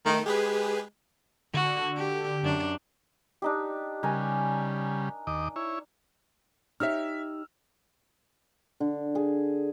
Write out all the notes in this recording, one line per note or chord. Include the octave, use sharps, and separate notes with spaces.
D#3 A3 D#4
G#3 G4 G#4 B4
D3 F#4
G4
F#2 D4
D4 D#4 G4
C#3 G3 A#4 G#5
D#2 D#5 D6
E4 C#5
D#4 G4 C#5 E5 E6 F6
D3
G#4